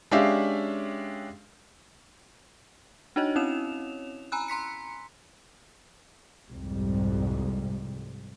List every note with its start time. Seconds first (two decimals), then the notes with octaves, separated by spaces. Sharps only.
0.11 G#3 C#4 D4 G4 E5 F5
3.16 D4 D#4 F#4 C#5 D#5
3.36 C4 C#4 E4 C#5 E7 F7
4.32 G#5 A#5 B5 E6 F#6
4.48 A#5 C6 B6 C#7
6.49 C2 F2 G#2 G3